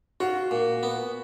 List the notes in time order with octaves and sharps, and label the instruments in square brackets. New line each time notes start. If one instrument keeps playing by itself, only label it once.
[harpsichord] F4 [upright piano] F#4
[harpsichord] A#2
B3